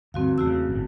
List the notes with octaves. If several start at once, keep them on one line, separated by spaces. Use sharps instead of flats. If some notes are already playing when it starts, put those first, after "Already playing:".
D2 G2 C4 F#4 F5
E2 C#3 A3 F#4 E6
G1 A2